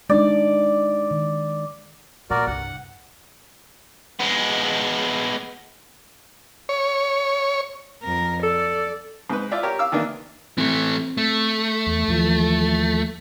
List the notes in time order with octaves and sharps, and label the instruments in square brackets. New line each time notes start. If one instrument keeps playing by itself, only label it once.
[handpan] G#3 D4 D#4 [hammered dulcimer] D5
[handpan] D#3
[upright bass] A#2 [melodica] F#4 A#4 D5
[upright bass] C2 G2 [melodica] F#5
[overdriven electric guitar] G#3 B3
[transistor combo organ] C#5
[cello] F2 A#4
[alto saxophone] A4 [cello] D5
[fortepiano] G#2 B4
F4 D5 E5
G4 A#4 C#5
F5 D6 E6
D#3 E3 A#3 D4
[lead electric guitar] E3 A3 [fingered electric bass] C4
[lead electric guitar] A3
[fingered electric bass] E2
D#2 E3 F3